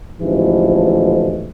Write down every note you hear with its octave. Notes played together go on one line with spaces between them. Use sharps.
A1 D2 G#2 B2 E3 F3